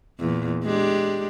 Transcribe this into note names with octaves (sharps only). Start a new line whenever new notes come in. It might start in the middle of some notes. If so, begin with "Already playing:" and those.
E2 A#2
G#3 D4 G4